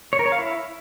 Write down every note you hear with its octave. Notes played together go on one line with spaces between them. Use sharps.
C#5
A#4
C#5
F5
E4